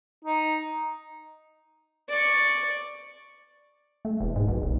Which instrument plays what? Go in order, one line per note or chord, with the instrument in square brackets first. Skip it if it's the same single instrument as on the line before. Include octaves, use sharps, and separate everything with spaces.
[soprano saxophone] D#4
[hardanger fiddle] D5 C#6
[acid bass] A3
E1
G#2
B1
D#1